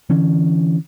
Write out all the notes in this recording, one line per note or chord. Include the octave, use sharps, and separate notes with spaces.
D3 E3 C#4